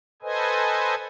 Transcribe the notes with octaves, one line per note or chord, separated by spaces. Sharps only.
A4 B4 C5 D#5 G#5